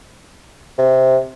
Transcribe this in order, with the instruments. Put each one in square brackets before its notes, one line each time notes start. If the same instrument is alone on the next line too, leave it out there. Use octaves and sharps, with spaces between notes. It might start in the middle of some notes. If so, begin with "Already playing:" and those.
[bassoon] C3